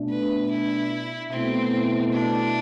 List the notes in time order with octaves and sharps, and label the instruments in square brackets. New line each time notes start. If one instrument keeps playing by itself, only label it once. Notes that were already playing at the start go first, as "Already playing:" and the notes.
Already playing: [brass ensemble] B2 A3 D4
[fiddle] B4
E4
[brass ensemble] B2 A3 E4 [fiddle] C4
[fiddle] D4